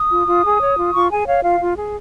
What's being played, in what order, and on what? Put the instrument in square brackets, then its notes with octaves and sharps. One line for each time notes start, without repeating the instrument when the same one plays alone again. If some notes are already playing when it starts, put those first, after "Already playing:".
Already playing: [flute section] D#6
F4
F4
G#4
C#5
F4
F4 C#6
G#4 G#5
C#5 F5
F4 F5
F4
G#4